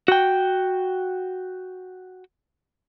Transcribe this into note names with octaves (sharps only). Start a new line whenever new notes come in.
F#4 G5